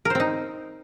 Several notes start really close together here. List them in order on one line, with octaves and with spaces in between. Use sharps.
A#4 C5 C4 D#4